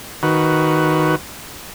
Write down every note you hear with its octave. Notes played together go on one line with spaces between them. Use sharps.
D#3 F#4 B4